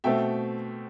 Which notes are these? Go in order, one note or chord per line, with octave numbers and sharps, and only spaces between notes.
B2 A3 C4 E5 G5